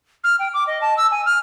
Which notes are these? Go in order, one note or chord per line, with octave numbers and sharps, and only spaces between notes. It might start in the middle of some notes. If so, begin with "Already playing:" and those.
F6
G5
D6
D#5
A5
E6
G#5
F6